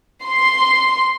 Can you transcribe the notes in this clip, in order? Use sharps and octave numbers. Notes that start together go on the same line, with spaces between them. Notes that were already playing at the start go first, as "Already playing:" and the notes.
C6